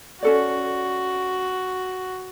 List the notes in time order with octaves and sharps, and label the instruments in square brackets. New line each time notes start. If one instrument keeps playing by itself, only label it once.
[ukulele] C#4 A4 D5 [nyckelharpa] F#4